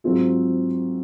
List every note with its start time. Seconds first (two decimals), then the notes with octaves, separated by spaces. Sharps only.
0.04 G#2 F#3 C4 F4 G#4